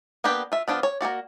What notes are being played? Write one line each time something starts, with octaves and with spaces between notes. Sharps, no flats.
A#3 B3 D4 G4 B4
F4 E5
F3 B3 D4 F4
C#5
A#3 C#4 F#4 D5